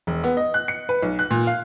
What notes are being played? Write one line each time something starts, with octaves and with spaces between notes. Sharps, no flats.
E1
B3
D#5
F#6
C#7
B4
B1
F#6
A#2
F5